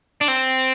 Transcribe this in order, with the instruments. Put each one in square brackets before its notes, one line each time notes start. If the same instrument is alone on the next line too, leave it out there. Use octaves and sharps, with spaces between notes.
[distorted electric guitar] D4
C4